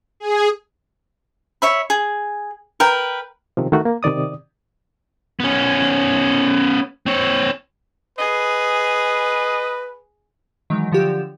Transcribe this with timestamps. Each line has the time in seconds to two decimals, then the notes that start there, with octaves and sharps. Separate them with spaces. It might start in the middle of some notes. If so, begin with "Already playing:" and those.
0.20 G#4
1.62 C#5 E5 B5
1.90 G#4
2.80 A#4 B4 G5
3.57 C3 D#3 F3
3.72 D#3 A3 F#4
3.85 A#3
4.03 C3 D#3 D5 D#6
5.40 B3 C#4
7.06 C4 C#5
8.18 G#4 B4 D#5
10.70 D#3 E3 F#3 G#3
10.92 D3 F3 F#3 G4 E7